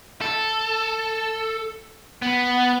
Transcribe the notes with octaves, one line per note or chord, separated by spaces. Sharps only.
A4
B3